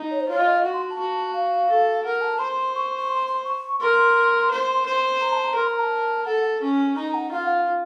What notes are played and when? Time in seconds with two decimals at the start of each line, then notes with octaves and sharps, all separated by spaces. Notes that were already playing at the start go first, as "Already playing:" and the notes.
Already playing: D#4
0.11 C#5
0.21 C5
0.28 F4 C#5
0.40 D#5
0.52 D#5
0.63 F#4 F#5
0.73 C6
0.91 A5
0.98 F#4
1.34 F5
1.69 A4
2.04 A#4 F#5
2.21 A5
2.39 C5 C6
2.75 C#6
2.98 C#6
3.09 C6
3.28 C6
3.45 C#6
3.80 A#4 C6
4.51 C5
4.85 C5
5.21 A#5
5.32 A5
5.44 A#5
5.55 A#4 C6
5.67 A#5
5.79 A5
6.26 A4 F#5
6.61 C#4
6.96 D#4 A#5
7.14 F#5
7.31 F4 F5
7.43 F#5